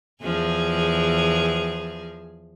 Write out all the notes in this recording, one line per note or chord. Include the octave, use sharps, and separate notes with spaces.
E2 F3 G#4